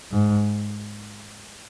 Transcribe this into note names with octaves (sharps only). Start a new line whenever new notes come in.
G#2